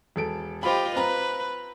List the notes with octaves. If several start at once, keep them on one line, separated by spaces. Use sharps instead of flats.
E1 A4 D7
F4 G4 C5 D#5 B5
C4 B4 A#5 B5